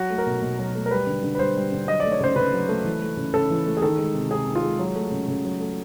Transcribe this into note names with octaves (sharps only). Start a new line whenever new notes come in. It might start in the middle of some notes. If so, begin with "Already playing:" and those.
Already playing: F#3 F#4
A3
A#4
B2
B2
F#3
A3
A#4
G3 B4
D3
D3
B4
G3 C5
G3
D3
F#3 D#5
D5
A3
C#5
C#3 C5
C#3 B4
F#3
A3
E3
A3
C#3
C#3 A4
E3
A3
G#4
D#3 A4
G#3
C3
C3 G#4
D#3
F4
G#3
F#3
A3
C#3
C#3
F#3
A3